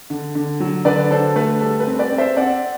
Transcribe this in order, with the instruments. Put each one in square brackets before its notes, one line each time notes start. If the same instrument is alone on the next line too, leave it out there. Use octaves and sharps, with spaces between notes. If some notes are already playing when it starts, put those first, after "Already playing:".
[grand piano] D3
D3
F#3
D3 B4 D5
D3 A4 C5
A3 B4
G3 A4
B4
C4
B4 D5
C4
C5 E5
C4 D5 F#5